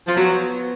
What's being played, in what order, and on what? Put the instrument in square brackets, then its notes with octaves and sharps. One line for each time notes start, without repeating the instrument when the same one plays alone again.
[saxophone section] F3
[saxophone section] F#3 [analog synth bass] B3